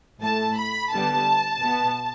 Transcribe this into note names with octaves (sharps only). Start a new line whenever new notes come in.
A2 A3 A5
B5
D3 G3 B3 A5
B2 B3